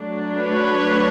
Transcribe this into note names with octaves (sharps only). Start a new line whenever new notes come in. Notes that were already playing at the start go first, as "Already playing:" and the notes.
Already playing: F#3 A3 D4
B4 C#5